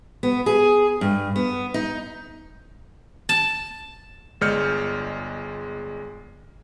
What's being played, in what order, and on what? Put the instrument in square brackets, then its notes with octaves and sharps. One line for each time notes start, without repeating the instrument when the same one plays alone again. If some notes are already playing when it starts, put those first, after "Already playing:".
[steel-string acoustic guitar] B3
G#4
G2
B3
D#4
[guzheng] A5
[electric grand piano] G1 G#3 D5 F6 G6 C#7